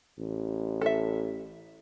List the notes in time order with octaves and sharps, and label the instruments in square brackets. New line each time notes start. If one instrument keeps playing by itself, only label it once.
[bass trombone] A1
[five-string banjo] A4 E5